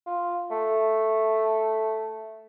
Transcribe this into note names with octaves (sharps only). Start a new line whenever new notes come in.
F4
A3